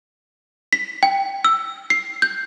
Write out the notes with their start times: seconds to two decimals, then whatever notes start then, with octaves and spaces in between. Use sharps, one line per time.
0.73 B6
1.03 G5
1.45 E6
1.90 C7
2.22 G6